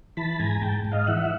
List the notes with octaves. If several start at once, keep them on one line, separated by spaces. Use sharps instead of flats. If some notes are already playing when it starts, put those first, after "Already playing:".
E3 A5 B5
G#2 G#5 A#5
G#2 G5 A5
G#2
D#5 F5
E3 E5 F#5